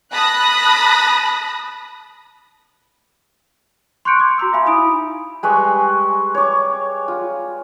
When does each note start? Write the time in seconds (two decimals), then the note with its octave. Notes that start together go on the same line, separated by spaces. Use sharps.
0.12 A5 B5 D#6 F#6 A#6
4.05 C6 C#6 F#6 G6 C#7 D7
4.19 C6 D6 G#6
4.38 F#4 A#5 C6 E6
4.53 E5 F5 G#5 B5 C6
4.66 D#4 E4 B5 D#6 D7
5.43 G3 G#3 B4 C#6
6.35 C#5 D6
7.08 F4